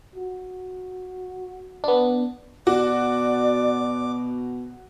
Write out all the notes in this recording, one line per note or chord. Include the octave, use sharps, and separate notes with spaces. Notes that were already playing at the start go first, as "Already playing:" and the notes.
F#4
B3 D4
B2 F#4 D5 D6